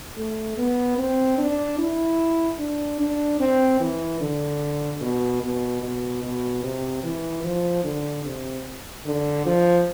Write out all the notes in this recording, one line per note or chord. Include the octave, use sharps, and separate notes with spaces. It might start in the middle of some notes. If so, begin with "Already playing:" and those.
A3
B3
C4
D4
E4
D4
D4
C4
E3
D3
B2
B2
B2
B2
C3
E3
F3
D3
C3
D3
F3